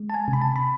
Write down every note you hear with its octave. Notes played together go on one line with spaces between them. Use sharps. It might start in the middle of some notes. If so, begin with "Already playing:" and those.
Already playing: G#3
A5
G#5
C3
B5
A5
B5